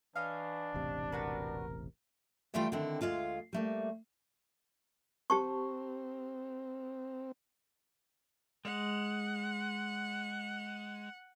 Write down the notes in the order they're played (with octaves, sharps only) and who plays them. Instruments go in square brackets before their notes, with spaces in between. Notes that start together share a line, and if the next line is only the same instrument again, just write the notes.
[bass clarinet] E3 [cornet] D4 [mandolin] C#5 D#5 F5
[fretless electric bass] E1 A1 C3
[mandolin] C4 F#4 B4 [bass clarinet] A#4
[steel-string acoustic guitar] E3 G3 A3 E4 F4 G5
D3 D#3 C4 E4
D2 E3 G#3 F4 F5
G3 A3 A#3
[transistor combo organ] C4 [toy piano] G4 A5 C#6
[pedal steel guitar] G#3 [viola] F#5